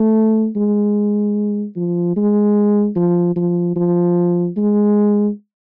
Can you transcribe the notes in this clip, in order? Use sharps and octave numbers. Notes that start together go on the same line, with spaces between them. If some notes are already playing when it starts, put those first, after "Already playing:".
Already playing: A3
G#3
F3
G#3
F3
F3
F3
G#3